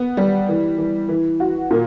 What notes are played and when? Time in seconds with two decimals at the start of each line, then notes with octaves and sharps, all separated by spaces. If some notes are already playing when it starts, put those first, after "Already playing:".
Already playing: B3
0.17 G3
0.49 E3
0.78 E3
1.08 E3
1.40 F#4
1.71 A#2